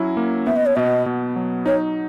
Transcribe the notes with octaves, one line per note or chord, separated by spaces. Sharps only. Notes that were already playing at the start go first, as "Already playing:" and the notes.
Already playing: F#3 C#4 E4
A#3
B3 E5
D#5
C#5
B2 D#5 E5
B2
F#3
D#4 C#5